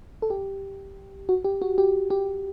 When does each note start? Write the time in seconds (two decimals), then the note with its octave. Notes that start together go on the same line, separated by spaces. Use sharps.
0.22 A4
0.30 G4
1.29 F#4
1.44 G4
1.62 F#4
1.78 G4
2.10 G4